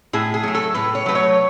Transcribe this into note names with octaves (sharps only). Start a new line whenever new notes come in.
A2 G#4
G#4
F#3 A3
A4
A2 B4
C#5
F#3 A3 B4
C#5